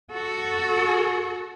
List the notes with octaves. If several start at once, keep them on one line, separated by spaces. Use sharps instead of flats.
F#4 A4